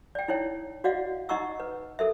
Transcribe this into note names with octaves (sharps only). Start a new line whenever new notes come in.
D5 G5
D#4 E4 C#5 G5
F#4 D5 D#5 F5 F#5
D#4 D#5 F#5 A#5 C#6 E6
B4
A4 A#4 E5